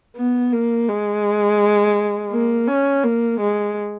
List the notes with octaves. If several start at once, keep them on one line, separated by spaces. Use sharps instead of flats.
B3
A#3
G#3
A#3
C#4
A#3
G#3